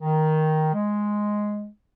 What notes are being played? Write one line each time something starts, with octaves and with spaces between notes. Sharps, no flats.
D#3
G#3